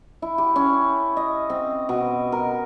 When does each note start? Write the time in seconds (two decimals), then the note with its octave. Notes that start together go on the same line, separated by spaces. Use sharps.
0.22 E4
0.38 G4
0.56 C#4
1.17 D#5
1.50 C4
1.89 B2
2.32 A#4